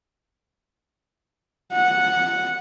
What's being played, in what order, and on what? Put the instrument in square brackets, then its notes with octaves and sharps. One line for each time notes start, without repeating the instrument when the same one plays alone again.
[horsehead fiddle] F#5